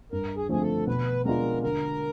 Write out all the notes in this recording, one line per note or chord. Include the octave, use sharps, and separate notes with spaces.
G2 A#4
G#4
D3 F3 A3 C4 G#4
A4
B2 B4
G#3 B3 D4 F4 A#4
D3 A#4